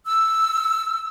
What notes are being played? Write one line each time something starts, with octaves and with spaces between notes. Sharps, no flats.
E6